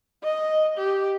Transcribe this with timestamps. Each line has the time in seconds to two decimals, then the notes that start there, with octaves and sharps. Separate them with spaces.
0.24 D#5
0.78 G4